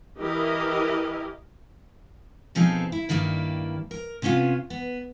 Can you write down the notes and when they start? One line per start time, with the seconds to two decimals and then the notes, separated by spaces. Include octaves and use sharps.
0.18 E3 E4 G4 A#4 D#5
2.55 B2 F3 C4 D#4 G#4 A4
2.92 E4
3.09 G2 D#3 G3 A#3 E4 D5
3.91 A#4
4.22 C3 B3 C#4 D#4 F4
4.70 B3